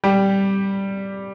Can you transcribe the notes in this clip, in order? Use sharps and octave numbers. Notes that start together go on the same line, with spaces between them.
G3 G4